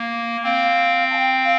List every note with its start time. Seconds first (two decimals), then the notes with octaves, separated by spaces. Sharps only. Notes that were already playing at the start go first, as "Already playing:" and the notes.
Already playing: A#3
0.44 C4 F5
1.10 A5
1.14 G5
1.44 F5